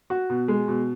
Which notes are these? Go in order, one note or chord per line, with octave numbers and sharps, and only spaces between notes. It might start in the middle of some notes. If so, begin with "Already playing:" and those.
F#4
B2
G#3
B2